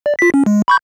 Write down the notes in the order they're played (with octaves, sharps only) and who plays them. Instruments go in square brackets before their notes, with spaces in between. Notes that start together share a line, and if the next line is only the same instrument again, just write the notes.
[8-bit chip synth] D5
F4 B6
C#4
G#3
B5 C#6 G6